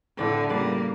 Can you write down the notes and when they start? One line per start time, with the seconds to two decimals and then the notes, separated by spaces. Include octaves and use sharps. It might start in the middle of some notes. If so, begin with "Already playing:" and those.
0.17 A2 D3 D5 G5
0.49 C#3 G3 A#3 B4 D5